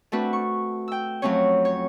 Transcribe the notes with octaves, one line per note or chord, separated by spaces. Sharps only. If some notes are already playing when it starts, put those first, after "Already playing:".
A3 C4 D4 F#4 B4
C#6
G5 E6
F2 F#3 A3 C4 C#4 C#5
C#5